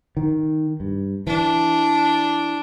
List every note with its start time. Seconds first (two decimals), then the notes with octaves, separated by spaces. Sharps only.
0.17 D#3
0.80 G2
1.27 E3 D4